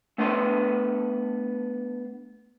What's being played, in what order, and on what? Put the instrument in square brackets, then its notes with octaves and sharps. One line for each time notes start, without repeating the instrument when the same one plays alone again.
[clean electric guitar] A3 B3 D4 B4 C6